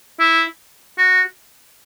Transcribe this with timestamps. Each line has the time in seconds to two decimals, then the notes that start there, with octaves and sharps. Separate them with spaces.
0.20 E4
0.98 F#4